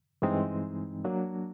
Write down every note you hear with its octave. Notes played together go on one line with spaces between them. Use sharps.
G2 E3 G#3 C4 D#4
F#3 A#3 D4